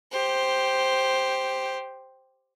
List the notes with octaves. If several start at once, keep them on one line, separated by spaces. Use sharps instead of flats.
G4 C5